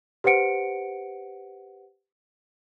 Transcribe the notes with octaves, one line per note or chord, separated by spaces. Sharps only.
G4 B4 C5 F#5 C#7 D7